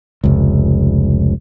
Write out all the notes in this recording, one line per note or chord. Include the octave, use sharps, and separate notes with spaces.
F1 C#2